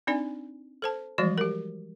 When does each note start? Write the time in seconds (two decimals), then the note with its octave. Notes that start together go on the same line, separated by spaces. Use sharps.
0.07 C4 D4 D#4 D5 G#5
0.82 A4 C5 A5
1.18 E3 F3 G3 G#3 F#4 D5
1.38 G4 A#4